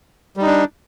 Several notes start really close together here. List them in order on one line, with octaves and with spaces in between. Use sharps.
G3 D#4 D4